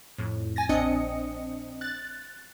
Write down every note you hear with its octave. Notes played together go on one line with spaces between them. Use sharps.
F2 A2
G#5 A6 A#6
A#1 C4 D4 D#5 D#6 C#7
F#6 A6